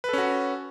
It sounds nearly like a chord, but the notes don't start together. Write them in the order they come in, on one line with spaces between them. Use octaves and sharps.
B4 A4 C#4 F#4